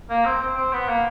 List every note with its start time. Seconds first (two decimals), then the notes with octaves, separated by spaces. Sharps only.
0.10 A#3
0.25 C4
0.42 C4
0.57 C4
0.73 B3
0.89 A#3